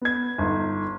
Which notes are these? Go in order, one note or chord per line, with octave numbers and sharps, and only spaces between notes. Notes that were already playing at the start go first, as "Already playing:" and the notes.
B3 G#6
G1 D#4